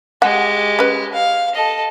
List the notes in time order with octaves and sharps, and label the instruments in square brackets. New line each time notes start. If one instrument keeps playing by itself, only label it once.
[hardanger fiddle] G#3 G4 [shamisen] F#5
[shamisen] C#4 B4
[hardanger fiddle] F5
A4 D#5